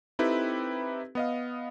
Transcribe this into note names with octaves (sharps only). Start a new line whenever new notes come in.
C4 D#4 E4 G4 A4 B4
B3 D#5 F5